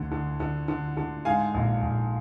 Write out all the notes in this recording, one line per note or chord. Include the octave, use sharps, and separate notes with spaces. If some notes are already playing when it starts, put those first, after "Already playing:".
Already playing: D2 D3
D3
D3
D3
D3
G#2 F5 G#5
A#1
A#1